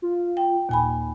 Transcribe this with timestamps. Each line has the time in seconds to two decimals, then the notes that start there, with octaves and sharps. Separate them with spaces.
0.02 F4
0.37 G5
0.69 D#2 A#2 G#5 B5